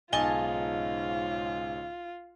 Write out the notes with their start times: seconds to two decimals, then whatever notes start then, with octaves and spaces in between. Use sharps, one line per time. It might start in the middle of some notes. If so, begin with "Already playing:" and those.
0.13 B1 G#2 C#3 D#4 F4 G#5 A5 G7